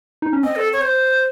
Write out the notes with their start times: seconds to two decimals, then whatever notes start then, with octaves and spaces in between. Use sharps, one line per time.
0.22 D#4
0.33 C#4
0.43 C4 D#5
0.56 A4
0.73 C#5
0.81 C5